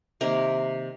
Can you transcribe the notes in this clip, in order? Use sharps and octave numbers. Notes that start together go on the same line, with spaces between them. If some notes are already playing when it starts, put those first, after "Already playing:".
C3 D#3 A#3 A#4